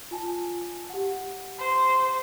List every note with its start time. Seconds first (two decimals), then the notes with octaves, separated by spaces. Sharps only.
0.11 F4 G#5 A5
0.89 G4 F#5
1.58 C5